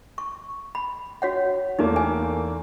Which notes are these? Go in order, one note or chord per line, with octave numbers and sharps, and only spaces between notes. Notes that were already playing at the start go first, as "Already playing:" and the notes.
C#6
B5
F#4 C#5 F#5
E2 A3 A#3 D#4
G#5